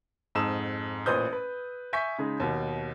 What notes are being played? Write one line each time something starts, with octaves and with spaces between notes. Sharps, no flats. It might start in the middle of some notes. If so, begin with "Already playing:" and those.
F2 G#2 A5 D#6 E6 E7
A1 A#2 B4 C5 D#6 G6
B4
E5 G#5 C#6 G6 B6
C#3 G#3 D#4 G#4
D#2 B2